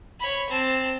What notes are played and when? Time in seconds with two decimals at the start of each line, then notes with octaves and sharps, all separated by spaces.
0.20 C#5 B5
0.49 C4 A5